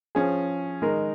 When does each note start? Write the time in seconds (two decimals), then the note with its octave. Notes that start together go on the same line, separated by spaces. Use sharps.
0.15 F3 C#4 G#4
0.82 D#3 G#3 D#4 A#4